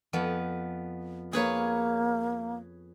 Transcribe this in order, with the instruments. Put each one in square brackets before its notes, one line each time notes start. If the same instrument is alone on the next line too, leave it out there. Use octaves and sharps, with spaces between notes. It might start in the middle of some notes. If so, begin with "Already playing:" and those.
[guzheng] F2 B3
[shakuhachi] A#3 [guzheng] G#4 B4 C#5